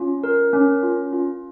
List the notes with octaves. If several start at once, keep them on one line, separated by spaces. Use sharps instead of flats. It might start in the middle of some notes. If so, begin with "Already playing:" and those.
Already playing: C#4 F4
A#4
C#4
F4
F4